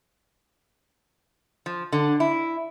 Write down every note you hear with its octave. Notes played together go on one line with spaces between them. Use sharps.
F3
D3
E4